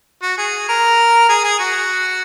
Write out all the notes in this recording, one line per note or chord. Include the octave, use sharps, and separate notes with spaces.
F#4
G#4
A#4
G#4
G#4
F#4